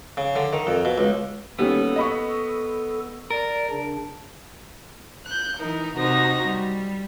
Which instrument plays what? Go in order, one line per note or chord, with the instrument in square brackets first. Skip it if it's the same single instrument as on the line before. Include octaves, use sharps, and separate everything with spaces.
[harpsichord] C#3
D3
D#3
F2
B2
C#2
[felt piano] D#2 G3 C#4 [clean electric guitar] B3 [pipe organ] A4
[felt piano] D#5 B5 C#6
[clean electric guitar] A#4 [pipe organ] D5
[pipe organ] C#3 D4
[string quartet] F#6 G6
E3 D#4 A#4
C3 D#4 F#4 C5 A#6
G3